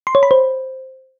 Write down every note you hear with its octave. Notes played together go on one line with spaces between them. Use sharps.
C6
C#5
B5
C5